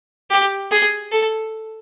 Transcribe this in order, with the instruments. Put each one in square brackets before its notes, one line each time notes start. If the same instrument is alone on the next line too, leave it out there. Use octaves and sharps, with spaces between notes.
[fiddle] G4
G#4
A4